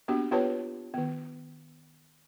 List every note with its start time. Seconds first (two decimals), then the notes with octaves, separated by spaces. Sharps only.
0.08 A#3 B3 D4 F#4 G4
0.31 B3 F4 G4 B4 C#5 A5
0.94 D#3 B3